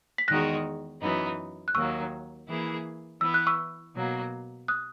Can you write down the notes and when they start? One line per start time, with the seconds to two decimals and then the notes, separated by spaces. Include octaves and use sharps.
0.18 B6
0.28 E2 D#3 G#3 D#4 F#4 F#6 A#6
1.02 F#2 E3 B3 D#4
1.68 F#6
1.75 D#2 D#3 F#3 A#3 C#6 E6
2.48 E3 A#3 E4 G#4
3.21 E3 B3 E4 E6
3.34 F#6
3.47 C#6 E6
3.94 B2 F#3 A#3
4.68 D#6 F#6